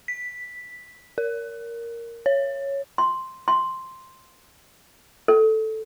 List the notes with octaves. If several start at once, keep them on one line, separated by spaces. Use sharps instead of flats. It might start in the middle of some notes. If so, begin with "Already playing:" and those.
B6
A#4
C#5
C6
C6
A4